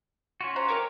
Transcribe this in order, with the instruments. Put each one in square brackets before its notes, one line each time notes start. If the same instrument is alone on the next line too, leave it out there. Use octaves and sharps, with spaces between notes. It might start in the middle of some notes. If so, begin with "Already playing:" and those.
[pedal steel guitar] C#4 F4 F#4
[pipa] C5 F#5 A#5
[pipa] F#3 C4 [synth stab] A#4 C#5 D6